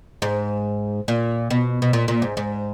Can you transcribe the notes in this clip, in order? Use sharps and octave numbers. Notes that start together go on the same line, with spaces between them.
G#2
A#2
B2
B2
A#2
A#2
G#2
G#2